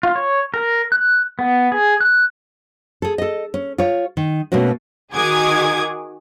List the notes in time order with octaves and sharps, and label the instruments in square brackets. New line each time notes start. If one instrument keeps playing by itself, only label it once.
[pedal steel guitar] F4
C#5
A#4
F#6
B3
G#4
F#6
[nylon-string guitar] G#4 A4
A4 D#5
C#4
F4 C#5
D#3
B2 A3 A#3 C#4 F#4
[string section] D#3 F#4 G#4 D6 D#6 G#6